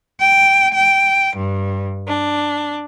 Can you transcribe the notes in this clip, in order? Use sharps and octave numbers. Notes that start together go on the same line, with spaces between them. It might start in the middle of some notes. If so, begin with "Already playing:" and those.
G5
G5
G2
D4